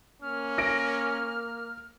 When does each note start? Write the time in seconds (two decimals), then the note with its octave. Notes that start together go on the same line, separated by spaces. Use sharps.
0.22 A#3 C#4 F6
0.58 A#6 D7